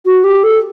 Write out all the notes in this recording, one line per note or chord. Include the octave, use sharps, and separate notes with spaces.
F#4
G4
A4